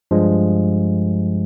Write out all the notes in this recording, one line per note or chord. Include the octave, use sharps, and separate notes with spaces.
G2 F3 G#3